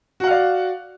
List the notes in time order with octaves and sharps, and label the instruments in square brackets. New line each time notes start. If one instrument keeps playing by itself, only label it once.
[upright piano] F#4
F#5
F5
D5